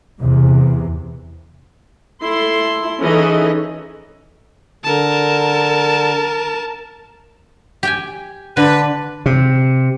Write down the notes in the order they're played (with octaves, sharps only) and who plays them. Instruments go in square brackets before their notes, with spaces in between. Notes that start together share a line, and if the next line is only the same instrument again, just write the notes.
[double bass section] E2 C3
[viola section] E4 A4 C6
E3 C#4 D#4 G#4 A4 D#5
[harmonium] D3 [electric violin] A#4 A5
[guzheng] G4 G5 G#5
[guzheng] D3 [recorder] D4 [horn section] B4
[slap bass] C3